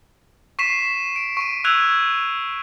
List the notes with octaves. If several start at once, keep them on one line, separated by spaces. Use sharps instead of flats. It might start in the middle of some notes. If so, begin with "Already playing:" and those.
C#6 B6 C7 E7
D7
C#6 D#7
C#6 E6 F#6 G#6 F7